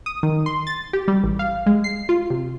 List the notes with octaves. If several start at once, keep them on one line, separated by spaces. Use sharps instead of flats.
D#6
D#3
C6
A6
G4
G3
A1
F5
G#3
C7
F4
C3